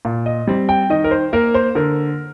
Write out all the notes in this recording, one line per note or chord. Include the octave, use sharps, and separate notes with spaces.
A#2
D#5
G3 C4
G5
D#3 D#5
A#4
C5
A#3 A#4
C5
D3 A#4